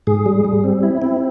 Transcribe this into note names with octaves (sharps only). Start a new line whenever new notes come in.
G#2 G#4
G3
G3
C4
E4
C4